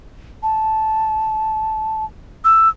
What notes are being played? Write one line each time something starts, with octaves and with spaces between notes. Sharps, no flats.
A5
E6